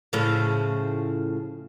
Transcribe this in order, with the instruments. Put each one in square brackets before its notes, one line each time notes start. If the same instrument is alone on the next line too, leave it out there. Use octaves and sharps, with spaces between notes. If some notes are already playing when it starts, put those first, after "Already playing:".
[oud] A2 C#3 F3